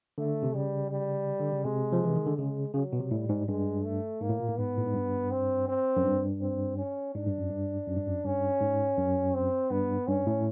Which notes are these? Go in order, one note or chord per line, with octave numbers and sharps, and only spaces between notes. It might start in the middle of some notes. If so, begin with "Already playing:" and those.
D3 A3
C3
C#3 G3
G3
D3
C#3
C3 G#3
F3
E3
D#3
D3
C#3 G#3
C#3 F#3
B2
C3
A2 G3
G#2
G2 G#3
A3
G#2 A#3
A2
A#2
A2
G#2 B3
A2
G#2
G2
C4
C4
F#2
G2
C4
C#4
G#2 D4
G2
F#2
G2
F#2
G2
F#2
G2 C#4
G#2
F#2
C4
G2 B3
G2 C#4
A2